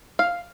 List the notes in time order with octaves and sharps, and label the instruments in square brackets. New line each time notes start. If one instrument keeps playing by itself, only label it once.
[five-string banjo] F5